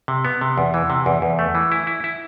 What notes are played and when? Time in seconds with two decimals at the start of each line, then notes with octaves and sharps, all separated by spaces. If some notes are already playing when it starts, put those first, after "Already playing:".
0.08 C3
0.25 B3
0.41 C3
0.58 E2
0.74 E3
0.90 C3
1.06 E2
1.22 E2
1.39 A3
1.55 E3
1.72 E4
1.87 E4
2.04 E4